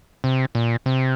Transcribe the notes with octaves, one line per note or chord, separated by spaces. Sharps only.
C3
A#2
C3